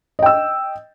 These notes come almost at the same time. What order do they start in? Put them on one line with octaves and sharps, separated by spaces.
D#5 G5 E6